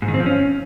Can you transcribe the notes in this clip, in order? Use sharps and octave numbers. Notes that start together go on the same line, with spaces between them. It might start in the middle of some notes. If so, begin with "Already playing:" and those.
G#2
D#3
C4
F3
C#4